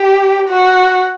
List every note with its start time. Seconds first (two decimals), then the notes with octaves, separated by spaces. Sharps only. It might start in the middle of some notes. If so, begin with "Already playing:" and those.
Already playing: G4
0.49 F#4